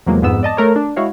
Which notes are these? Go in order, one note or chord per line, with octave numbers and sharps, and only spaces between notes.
E2 C3 F3 F#3 G#3 A#3
F2 G#2 B3 E6
D5 D#5 A5
A3 A#4 C#5
D4
G#3 E4 F#4 C#5 F5